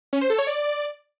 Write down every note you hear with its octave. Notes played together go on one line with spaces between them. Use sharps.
C#4
C5
A4
C#5
D5